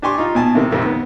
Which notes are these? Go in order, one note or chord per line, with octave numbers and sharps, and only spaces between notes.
D4 G4 G#5 C6 C#6
D#4 F4
B2 G#5 A5
C3 D#3
F2 C3 D#3
B3